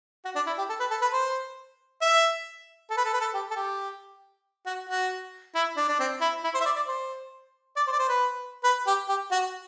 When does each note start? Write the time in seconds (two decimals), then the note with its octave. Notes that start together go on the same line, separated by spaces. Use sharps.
0.25 F#4
0.36 D4
0.47 E4
0.58 G4
0.69 A4
0.80 B4
0.91 A4
1.02 B4
1.13 C5
2.02 E5
2.90 A4
2.97 B4
3.05 A4
3.13 B4
3.21 A4
3.34 G4
3.51 A4
3.56 G4
4.66 F#4
4.89 F#4
5.55 E4
5.77 D4
5.89 D4
6.00 C4
6.21 E4
6.44 E4
6.54 C5
6.61 E5
6.66 D5
6.76 D5
6.88 C5
7.76 D5
7.87 C5
7.92 D5
7.99 C5
8.09 B4
8.64 B4
8.87 G4
9.09 G4
9.31 F#4